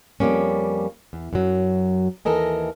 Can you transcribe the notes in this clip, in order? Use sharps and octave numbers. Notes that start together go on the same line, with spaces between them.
F2 F3 G3 A#3 C#4
E2
F#2 F#3
D#2 E3 A4 A#4 D#5 G#5